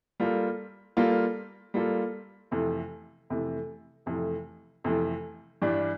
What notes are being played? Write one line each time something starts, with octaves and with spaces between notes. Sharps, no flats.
G3 A#3 F4 A4
G3 A#3 F4 A4
G3 A#3 F4 A4
F2 C3 E3 A3
F2 C3 E3 A3
F2 C3 E3 A3
F2 C3 E3 A3
G2 E3 G3 D4